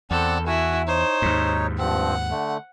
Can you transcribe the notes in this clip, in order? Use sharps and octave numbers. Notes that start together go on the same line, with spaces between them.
E2 C4 A4 D5 F#5
E4 F#4 F#5 G#5
D#4 C5 C#5
D#2 G#2
G2 F3 C4 F#5
D3 A3